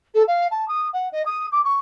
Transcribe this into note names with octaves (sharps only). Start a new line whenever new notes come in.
A4
F5
A5
D#6
F#5
D#5
D#6
D6
C#6